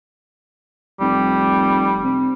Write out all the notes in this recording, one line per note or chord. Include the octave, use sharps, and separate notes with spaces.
F1 G3
C3